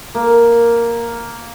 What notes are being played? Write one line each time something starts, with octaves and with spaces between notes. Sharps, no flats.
A#3